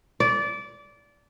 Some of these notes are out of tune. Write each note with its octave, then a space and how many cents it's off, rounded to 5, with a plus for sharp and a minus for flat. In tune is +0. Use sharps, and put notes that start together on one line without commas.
D5 -20